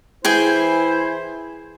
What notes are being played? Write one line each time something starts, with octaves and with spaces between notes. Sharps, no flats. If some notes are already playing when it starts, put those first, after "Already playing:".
E3 E4 G#4 C5 G5 G#5